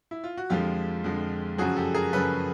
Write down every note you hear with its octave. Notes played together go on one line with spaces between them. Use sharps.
E4
F4
F#4
F2 D3 F3 G#3 F4 G4
F2 D3 F3 G#3
F#2 C#3 F3 F#4 G#4
G4 A4
G#4 A#4
F#2 C#3 F3 A4 B4